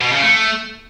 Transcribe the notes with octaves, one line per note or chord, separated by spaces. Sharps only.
B2
C#3
A3